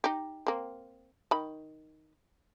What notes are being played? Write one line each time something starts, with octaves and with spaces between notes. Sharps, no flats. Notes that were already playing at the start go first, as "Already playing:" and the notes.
D#4 G4
A#3 C4
D#3 B5